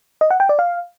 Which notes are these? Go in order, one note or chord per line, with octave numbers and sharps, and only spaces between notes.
D#5
F#5
G5
D5
F5